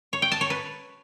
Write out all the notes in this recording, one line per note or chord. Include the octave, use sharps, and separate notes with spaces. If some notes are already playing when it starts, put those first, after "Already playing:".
C#5
G5
A5
C#5
B4